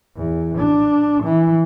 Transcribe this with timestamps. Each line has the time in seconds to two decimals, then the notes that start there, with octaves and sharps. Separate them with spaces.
0.17 E2
0.58 D4
1.23 E3